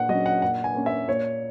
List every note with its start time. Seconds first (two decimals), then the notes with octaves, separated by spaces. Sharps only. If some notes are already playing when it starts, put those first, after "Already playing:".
Already playing: A#2 F#5
0.09 F#3 D#5
0.14 C#4
0.26 F#5
0.42 A#2 F#5
0.64 G#5
0.74 A#3 C#4
0.86 E5
1.08 A#2 C#5